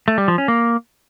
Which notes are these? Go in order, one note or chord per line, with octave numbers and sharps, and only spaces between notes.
A3
G3
F3
C#4
A#3